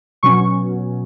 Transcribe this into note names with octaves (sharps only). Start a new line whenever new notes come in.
B2 F#3 C#4 C#6